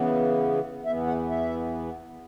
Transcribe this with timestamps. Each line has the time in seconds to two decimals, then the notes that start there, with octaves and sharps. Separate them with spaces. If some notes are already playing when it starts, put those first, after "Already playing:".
Already playing: C#3 E3 B3
0.85 E2 E3 B3 E5
1.07 F#5
1.29 E5